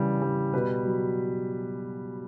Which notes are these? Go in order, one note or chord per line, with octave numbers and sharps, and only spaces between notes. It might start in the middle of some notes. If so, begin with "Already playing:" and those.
Already playing: C#3 E3 G3
G3
B2 B4
F#3